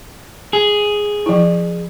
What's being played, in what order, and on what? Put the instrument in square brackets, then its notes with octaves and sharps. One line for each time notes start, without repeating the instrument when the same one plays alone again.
[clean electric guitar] G#4
[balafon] F3 E4